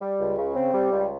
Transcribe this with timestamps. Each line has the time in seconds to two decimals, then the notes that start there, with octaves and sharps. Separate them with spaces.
0.01 G3
0.20 C#2
0.37 C#3
0.55 C4
0.73 G3
0.91 C#2